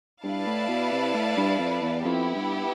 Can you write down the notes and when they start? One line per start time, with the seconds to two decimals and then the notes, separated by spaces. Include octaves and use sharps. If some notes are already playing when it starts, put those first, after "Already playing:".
0.24 G2 E4 B4 D5 F5 A5
0.46 A2
0.68 B2
0.92 C3
1.14 A2
1.37 G2
1.59 F2
1.82 E2
2.05 F2 B3 E4 G4
2.35 G2